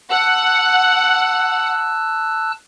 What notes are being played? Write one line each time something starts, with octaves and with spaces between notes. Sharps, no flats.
F#5 A5 E6 F#6